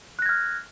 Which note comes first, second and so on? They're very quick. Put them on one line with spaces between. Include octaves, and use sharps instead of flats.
F#6 A#6 G#6 F6